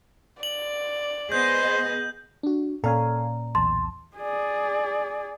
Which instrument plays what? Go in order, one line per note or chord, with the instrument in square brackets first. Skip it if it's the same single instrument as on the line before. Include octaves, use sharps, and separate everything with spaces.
[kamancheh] D5 [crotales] F#7
[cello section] B3 G#4 D#5 [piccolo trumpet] C5 [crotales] G6
[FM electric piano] D4 F#4
[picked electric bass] A#2 [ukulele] C#4 D5 A#5 [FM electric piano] A4 F5 G#5
[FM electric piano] B1 E2 A5 [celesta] C6
[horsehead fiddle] G#4 D5